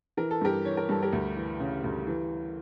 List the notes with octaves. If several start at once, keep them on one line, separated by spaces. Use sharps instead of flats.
E3 A#4
A4
G2 G4 A#4
E3 C#5
A#4
G2 A4
G4 A#4
D2
E3
C#3
D2
E3